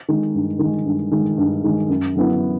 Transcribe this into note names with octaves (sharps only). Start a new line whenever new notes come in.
D#3 G#3
G2
D#3 G#3
G2
D#3 G#3
G2
D#3 G#3
F#2
D3 F#3 B3 E4